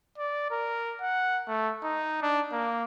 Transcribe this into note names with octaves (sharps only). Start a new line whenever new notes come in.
D5
A#4
F#5
A3
D#4
D4
A#3